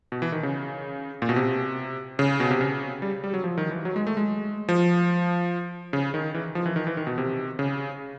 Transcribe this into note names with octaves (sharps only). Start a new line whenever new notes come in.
B2
E3
D#3
C#3
A#2
B2
C3
C#3
B2
C3
C#3
G3
G3
F#3
F3
D#3
E3
F#3
G#3
A3
G#3
F3
C#3
D#3
E3
F3
E3
D#3
E3
D#3
B2
C3
C#3